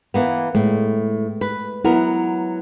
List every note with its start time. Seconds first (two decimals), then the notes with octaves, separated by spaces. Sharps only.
0.14 E3 A#3 B3
0.55 A2 G#3 A3
1.41 B4
1.85 F#3 B3 E4 A#4